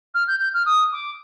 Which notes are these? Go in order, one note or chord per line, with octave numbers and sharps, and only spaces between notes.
F6
G6
G6
F6
D#6
D6